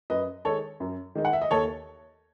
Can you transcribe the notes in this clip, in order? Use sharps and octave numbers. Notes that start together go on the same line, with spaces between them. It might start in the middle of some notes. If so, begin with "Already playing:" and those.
F#2 B4 D#5
D#3 G#3 D#4 A4 C#5
F#2
D#3 G#3 D#4
F#5
E5
D#5
D#2 A4 C#5